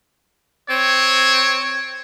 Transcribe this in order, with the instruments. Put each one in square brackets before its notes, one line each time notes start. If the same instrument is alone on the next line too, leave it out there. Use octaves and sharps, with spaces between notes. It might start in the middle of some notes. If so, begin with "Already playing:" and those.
[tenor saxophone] C4 [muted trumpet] C#5